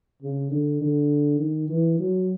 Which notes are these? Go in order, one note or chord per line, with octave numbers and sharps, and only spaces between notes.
C#3
D3
D3
D#3
E3
F#3